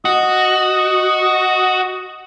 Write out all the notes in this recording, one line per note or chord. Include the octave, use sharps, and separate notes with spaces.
F#4 D#5